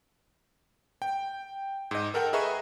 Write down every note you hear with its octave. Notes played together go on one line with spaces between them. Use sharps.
G5
G#2 D#5
A4 A#4 F#5 G5
G#4 B4 D#5 E5 A#5 C#6